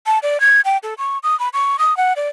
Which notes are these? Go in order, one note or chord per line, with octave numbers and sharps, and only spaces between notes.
A5
D5
G#6
G5
A4
C#6
D#6
B5
C#6
D#6
F#5
D5